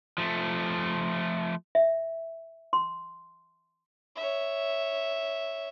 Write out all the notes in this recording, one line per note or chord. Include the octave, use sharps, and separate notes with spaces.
F3 A3
E5
C6
C#5 E5